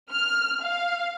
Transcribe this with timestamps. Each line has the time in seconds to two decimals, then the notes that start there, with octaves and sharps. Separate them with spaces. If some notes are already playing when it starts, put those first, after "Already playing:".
0.13 F6
0.64 F5